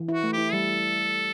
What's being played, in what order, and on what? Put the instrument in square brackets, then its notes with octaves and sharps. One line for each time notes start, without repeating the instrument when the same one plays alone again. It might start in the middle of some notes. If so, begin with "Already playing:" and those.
Already playing: [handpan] E3
E4
[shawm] F#4
[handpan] A3
[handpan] E4 [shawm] G4
[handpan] G3 [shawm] A4